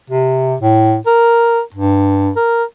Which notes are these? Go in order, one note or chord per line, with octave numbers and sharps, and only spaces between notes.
C3
A2
A#4
G2
A#4